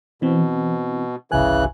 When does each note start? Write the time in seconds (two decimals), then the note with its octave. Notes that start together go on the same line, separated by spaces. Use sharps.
0.22 B2 E3 C4
1.32 G1 C2 C#3 E3 G#5 F#6